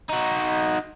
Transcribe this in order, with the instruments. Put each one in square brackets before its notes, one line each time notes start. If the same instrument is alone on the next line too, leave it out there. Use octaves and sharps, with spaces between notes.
[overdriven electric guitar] D#4 F#4